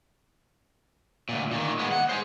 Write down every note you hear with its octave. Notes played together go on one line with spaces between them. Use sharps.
D2 A#2
A#2 D#3
G#3 B3
F#5
G#4 C5